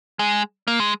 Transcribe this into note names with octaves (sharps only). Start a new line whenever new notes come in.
G#3
A#3
G#3